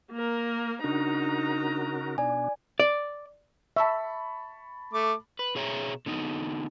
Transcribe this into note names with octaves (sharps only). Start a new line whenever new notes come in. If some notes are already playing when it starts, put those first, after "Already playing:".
A#3 A#4
C#3 D4 D#4 F#4 A#4 A#5
B2 D4 D5 G#5
D5
E5 A5 B5 C#6
A3 D6
B4
B2 G#4 C#5 E5 A#5
D3 B3 D#4